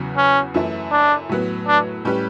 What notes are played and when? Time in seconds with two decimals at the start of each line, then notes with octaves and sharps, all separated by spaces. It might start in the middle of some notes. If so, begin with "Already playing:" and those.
Already playing: E2 C#3 F#3 B3
0.17 C#4
0.54 F#2 E3 A3 E4
0.92 D4
1.29 A2 F#3 B3
1.67 D4
2.05 A2 G3 C#4 G4 B4